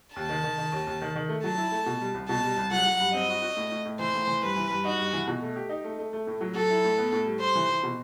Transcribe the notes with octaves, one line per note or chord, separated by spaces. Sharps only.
D#2 A5
D#3
D#3
D#3
D#2
D#2
D#3
D#3
A3
F#3 A5
E4
A3
B2
G3
C2
B2 A5
G3
C2
F#3 F#5
F#3
G2
C4 D#5
F#4
F#4
A2
A2
A2
E3 C5
A2
E3
G2 B4
E3
G2
D#4 F#4
G2
E3
B2
A3
G4
D#4
A3
A3
A3
A2
F#3
F#3 A4
E4
A2
B3
A2
G3
G3 C5
E3
E3
B2